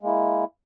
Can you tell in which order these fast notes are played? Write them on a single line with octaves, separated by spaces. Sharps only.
G#3 A#3 E4